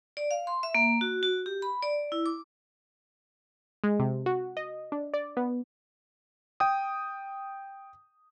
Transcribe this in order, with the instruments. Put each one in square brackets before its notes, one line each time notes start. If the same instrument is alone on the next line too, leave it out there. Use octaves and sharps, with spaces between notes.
[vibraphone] D5
F5
C6
E5
A#3
F#4
F#4
G4
B5
D5
E4
D6
[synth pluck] G#3
C3
F#4
D#5
D4
D5
B3
[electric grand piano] G5 D#6